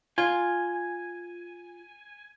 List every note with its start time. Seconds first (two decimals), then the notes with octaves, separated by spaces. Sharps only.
0.18 F4 G#5